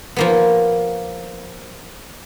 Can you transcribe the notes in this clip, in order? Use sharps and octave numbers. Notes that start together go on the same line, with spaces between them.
F3 A#3 B3